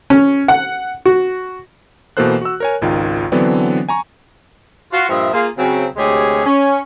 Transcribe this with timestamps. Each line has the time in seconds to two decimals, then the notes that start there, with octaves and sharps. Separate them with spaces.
0.10 C#4
0.48 F#5
1.05 F#4
2.17 B2 E3 A#3 A4 C5 F#6
2.41 F#4 E6
2.60 A#4 C#5 G#5
2.82 G#1 C#2 D#3 F4
3.32 D3 E3 F#3 B3 C4 D4
3.89 G#5 A#5 C#6
4.92 F4 F#4
5.09 G2 A#2 F3 D#5 E5
5.33 A#3 F4 G#4
5.57 C#3 F#3 C4
5.97 D2 C3 G#3 G4 G#4 C#5
6.46 C#4